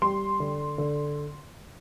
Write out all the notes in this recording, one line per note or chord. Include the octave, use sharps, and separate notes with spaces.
G3 C6
D3
D3